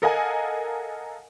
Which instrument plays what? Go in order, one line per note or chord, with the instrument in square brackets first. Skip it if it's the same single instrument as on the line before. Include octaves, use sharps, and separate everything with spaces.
[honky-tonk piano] A4 A#4 D#5 F5 F#5 G#5